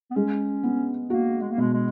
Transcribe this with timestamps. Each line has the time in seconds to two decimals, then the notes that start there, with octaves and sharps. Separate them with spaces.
0.11 B3
0.15 G#3 C#4
0.63 B3
1.10 A#3 F#4
1.41 G#3
1.51 A#3
1.58 B2 G#3
1.73 G#3